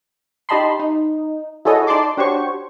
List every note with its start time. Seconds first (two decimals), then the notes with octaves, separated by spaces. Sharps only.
0.49 D#4 G4 D#5 A5 B5 C6
0.79 D#4
1.65 E4 F#4 G#4 A4 C#5 D#5
1.87 D#4 D5 A5 C6 D6
2.17 D4 F#4 G4 C5 C#5 C#6